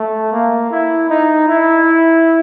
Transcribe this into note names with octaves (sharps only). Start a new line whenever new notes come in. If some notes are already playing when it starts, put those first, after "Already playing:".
Already playing: A3
A#3
E4
D#4
E4